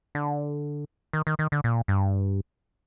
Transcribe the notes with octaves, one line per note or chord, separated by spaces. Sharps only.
D3
D#3
D#3
D#3
D3
A#2
G2